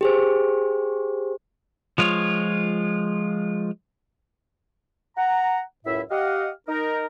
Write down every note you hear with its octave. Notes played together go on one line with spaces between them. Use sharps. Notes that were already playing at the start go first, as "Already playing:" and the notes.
G4 G#4 C5
F3 G#3 F4 C#5
F#5 A#5
C#2 F#2 A2 E4 E5
G4 D#5 F5 F#5
D#4 A#4